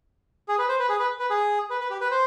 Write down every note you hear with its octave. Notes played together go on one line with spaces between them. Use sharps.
G#4
B4
C5
B4
G#4
B4
B4
G#4
B4
B4
G4
B4
C5